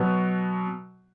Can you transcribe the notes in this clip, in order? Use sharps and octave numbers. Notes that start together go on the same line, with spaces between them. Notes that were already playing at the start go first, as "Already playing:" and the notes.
Already playing: B2 F#3 B3 F#4